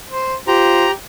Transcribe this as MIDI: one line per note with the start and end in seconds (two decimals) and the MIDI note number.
0.11 0.35 72
0.48 0.87 65
0.48 0.91 67
0.48 0.87 72
0.48 0.91 82